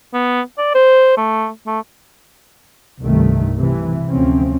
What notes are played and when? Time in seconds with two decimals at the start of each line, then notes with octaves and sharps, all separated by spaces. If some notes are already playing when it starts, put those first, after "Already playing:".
0.13 B3
0.58 D5
0.74 C5
1.17 A3
1.67 A3
3.00 C2 G2 D#3 A3
3.57 C3 E3
4.10 D2 F3 C4 C#4